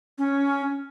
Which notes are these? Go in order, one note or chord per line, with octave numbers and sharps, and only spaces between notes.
C#4